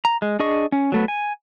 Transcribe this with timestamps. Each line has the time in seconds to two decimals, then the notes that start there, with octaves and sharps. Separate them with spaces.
0.05 A#5
0.22 G#3
0.39 D4 G#4 D#5 C#6
0.72 C#4
0.92 F#3 A3 B3
1.08 G#5